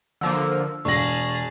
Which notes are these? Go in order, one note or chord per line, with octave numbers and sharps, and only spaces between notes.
D3 F3 A#3 E6
E1 G#4 F5 A5 C#6 A#6 F#7